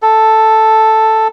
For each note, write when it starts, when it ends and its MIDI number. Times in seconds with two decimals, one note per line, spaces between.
0.02 1.28 69